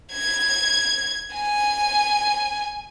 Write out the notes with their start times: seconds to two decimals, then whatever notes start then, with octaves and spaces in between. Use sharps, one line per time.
0.12 G#6
1.34 G#5